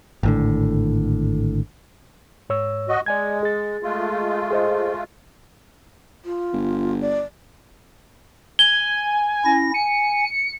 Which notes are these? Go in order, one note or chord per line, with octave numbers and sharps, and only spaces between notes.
G#1 A2 D3
G#2 C#5 E6
F#4 D#5
G#3 D5 G#5 G#6
G#4 A6
G#3 A3 F4
G#4 C5 D#5
F4
G1
D5
G#5 G7
C#4 E4 A#6
G#5 C#7